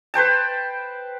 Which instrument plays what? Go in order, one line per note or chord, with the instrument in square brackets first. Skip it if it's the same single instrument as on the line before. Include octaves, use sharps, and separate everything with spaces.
[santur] B4 C5 G5 A5